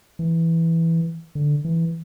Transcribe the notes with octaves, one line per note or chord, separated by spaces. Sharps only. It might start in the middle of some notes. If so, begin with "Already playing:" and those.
E3
D3
E3